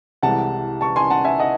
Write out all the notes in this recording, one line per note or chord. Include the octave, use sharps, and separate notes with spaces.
C2 C3 E3 G#3 F#5 A5
A5 C#6
G#5 C6
F#5 A5
E5 G#5
D#5 F#5